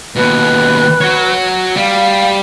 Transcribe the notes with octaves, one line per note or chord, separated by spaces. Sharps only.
D#2 B2 B4
F#4 C#5
G3 F5